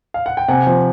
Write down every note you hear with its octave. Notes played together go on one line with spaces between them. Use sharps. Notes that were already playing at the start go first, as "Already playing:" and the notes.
F5
F#5
G5
C3 F#5 G#5
F3